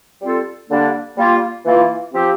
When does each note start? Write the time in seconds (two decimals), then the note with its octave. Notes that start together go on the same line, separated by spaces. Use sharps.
0.22 G3 C4 F4 A4
0.69 D3 G3 A#3 D4
1.17 G3 A#3 F4
1.65 E3 A#3 F4
2.13 F3 C4 G4